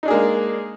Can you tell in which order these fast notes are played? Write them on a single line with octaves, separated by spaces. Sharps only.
D#4 D4 G#4 A#3 G#3